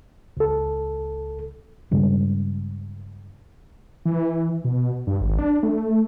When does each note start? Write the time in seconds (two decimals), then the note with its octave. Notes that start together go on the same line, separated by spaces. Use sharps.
0.37 C#2 A4
1.91 G2 C#3 G3 G#3
4.05 E3
4.65 B2
5.07 G2
5.20 G#1
5.39 D4
5.63 A3